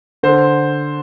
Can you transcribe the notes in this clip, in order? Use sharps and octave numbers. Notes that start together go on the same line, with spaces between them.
D3 C5